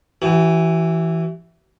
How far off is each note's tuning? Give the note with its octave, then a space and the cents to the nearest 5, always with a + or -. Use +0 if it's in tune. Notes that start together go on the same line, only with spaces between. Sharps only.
E3 +0 F#4 +45